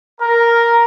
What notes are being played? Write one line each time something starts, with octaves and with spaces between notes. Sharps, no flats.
A#4